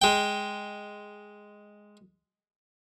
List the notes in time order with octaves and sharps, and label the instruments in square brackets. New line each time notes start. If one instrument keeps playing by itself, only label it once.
[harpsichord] G#3 G5